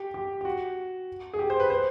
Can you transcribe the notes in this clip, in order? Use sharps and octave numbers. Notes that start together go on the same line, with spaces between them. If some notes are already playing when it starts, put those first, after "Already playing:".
Already playing: G4
G4
G4
F#4
G#4
G4
C5
B4
C5